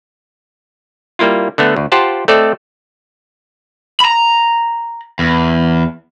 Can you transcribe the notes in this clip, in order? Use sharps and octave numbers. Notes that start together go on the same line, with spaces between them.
G3 A#3 E4 F4
D3 A3 B3
D2
F4 G4 C5 F#5 A5
A3 C4 A4 D5 D#5
A#5 B5
E2